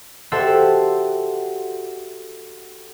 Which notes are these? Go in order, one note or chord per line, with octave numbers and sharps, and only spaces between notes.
F#4 G4 A4 C5 E5 F#5